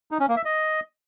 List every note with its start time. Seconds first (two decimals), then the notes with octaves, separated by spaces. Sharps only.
0.11 D#4
0.20 C#4
0.28 A#3
0.37 E5
0.45 D#5